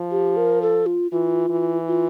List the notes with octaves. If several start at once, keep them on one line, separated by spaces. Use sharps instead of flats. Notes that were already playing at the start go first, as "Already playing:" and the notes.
Already playing: F3
G4
A#4
A4
F4
E3 F4
E3
F4